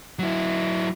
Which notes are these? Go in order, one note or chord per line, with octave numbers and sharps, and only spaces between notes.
F#3 E4